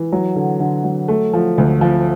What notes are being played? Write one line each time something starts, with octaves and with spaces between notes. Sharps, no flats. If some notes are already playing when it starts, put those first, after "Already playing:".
Already playing: E3
F#3
D3
D3
F#3
A3
F3
D2
F3